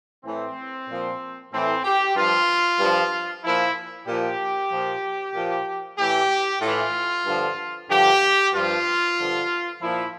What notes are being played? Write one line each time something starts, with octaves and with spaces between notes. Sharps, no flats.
A2 E3 C4
A#2 F3
A2 E3 C4
G4
G2 F3 F4
G2 F3
A#2 F3 E4
A#2 F3 G4
A#2 F3
A#2 F3
A2 E3 G4
A2 E3 F4
G2 D3 F3
G2 D3 F3 G4
G2 F3 F4
G2 D3 F3
A#2 F3 E4